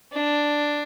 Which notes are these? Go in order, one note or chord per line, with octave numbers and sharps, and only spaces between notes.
D4